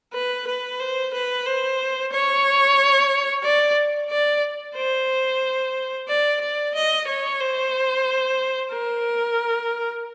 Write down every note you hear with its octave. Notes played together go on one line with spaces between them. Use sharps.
B4
B4
C5
B4
C5
C#5
D5
D5
C5
D5
D5
D#5
C#5
C5
A#4